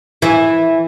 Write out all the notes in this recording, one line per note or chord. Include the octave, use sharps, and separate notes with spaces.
E3